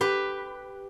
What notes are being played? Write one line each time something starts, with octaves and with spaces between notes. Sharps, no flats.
G4 B4